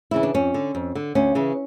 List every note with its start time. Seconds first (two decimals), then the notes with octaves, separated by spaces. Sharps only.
0.11 C#3 E3 E4
0.23 D4
0.34 F2 C#4
0.54 D3
0.75 F2
0.95 D3
1.15 D2 C#4
1.35 C#3 E3